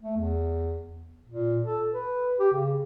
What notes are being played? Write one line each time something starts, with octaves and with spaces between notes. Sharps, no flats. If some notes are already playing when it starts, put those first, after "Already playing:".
A3
E2
A#2
A4
B4
G4
C#3